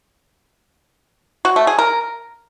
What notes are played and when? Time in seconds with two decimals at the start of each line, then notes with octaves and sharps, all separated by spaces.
1.45 F#4
1.56 A3
1.67 G#4
1.79 A#4